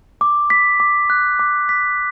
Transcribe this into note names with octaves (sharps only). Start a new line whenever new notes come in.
D6
B6
D6
F#6
D6
B6